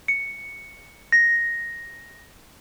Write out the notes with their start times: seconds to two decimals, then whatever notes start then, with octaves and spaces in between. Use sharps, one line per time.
0.08 C#7
1.12 A#6